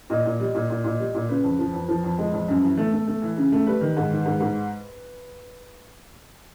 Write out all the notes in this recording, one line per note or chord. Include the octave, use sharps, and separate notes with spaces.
A#2 D#5
A#2
G3
A#2
A#2
A#2
G3
A#2
C#3 B4
F2
F3
F2
F3
F2
G#3
F2
F#2
E3
A3
A3
A3
E3
C#3
A3
G3 B4
D#3
G#2
D#3
G#2
G#2